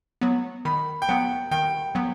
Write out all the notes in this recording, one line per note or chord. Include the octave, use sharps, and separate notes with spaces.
F#3 B3
D#3 B5
G5
F#3 B3 F#5
D#3 G5
F#3 B3